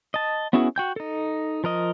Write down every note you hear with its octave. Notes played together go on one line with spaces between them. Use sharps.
D#5 A5
B3 C#4 E4 F#4 G#4
F#4 G5 G6
D#4 A4
F3 A#4 D#5